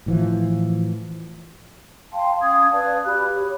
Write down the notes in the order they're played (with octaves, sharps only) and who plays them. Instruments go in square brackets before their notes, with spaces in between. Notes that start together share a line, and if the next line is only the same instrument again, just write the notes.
[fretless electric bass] A2 E3 F3
[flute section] F5 G5 A5 C6
C#4 F5 D#6 G#6
B4 D5 F5 A5
F#4 G4 B5 F#6
G4 C#5